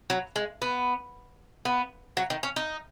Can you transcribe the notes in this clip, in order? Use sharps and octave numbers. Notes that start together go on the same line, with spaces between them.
F#3
G#3
B3
B3
F#3
D#3
C#4
D#4